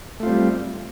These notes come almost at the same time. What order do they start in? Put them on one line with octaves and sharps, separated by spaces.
A3 F4 C4 G3